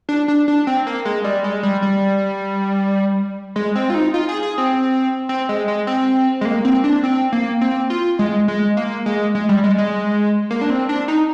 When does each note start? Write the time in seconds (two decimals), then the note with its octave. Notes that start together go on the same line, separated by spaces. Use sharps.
0.09 D4
0.28 D4
0.48 D4
0.67 C4
0.87 A#3
1.05 G#3
1.24 G3
1.44 G#3
1.63 G3
1.82 G3
3.56 G#3
3.75 C4
3.90 F4
3.95 D#4
4.14 F4
4.29 G#4
4.43 G#4
4.58 C4
5.29 C4
5.49 G#3
5.68 G#3
5.87 C4
6.41 G#3
6.45 A#3
6.65 C4
6.84 D4
7.03 C4
7.32 A#3
7.61 C4
7.90 F4
8.19 G#3
8.48 G#3
8.77 A#3
9.06 G#3
9.35 G#3
9.49 G3
9.64 G#3
9.78 G#3
10.50 A#3
10.61 D4
10.70 C4
10.89 D4
11.08 D#4